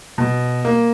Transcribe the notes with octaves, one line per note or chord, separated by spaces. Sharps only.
B2
A#3